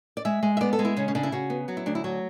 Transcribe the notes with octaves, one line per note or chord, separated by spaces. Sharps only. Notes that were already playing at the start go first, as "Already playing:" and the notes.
D5
G#3 E5
G#3
E5
B3 D5
A4
G#3
E4
C#3 C#4
C#4
C#3 D4
E4
C#3 F#4
B3
F#3 F#4
E4
D2 D4
E4
F#3 F#4